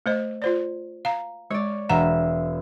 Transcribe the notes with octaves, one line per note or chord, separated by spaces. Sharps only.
A3 C5 D#5
F4 C5 D5
F5 A#5
G#3 C#5 D5
E1 E5 F#5 A#5